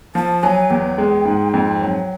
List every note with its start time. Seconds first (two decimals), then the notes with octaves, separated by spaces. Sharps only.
0.15 F3 A5
0.43 F#3 G#5
0.70 E2 G5
0.98 G#3
1.25 G#2
1.54 F2
1.81 F#3